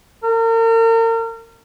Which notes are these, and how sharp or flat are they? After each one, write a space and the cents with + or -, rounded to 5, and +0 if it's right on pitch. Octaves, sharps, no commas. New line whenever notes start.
A#4 -40